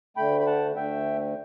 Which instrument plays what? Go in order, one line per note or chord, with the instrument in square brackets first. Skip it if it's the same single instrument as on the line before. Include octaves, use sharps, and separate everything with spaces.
[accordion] D2 D3 A3 G5 B5
B5
F#5 A5
D2 D3 A3 E5 G5